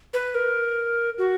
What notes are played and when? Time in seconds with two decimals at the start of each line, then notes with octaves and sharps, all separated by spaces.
0.14 B4
0.35 A#4
1.18 F#4